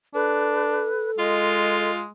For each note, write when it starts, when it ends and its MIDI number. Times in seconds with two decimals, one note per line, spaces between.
0.14 0.87 62
0.14 1.91 69
0.14 1.11 71
1.19 2.10 56
1.19 2.01 65
1.19 1.93 75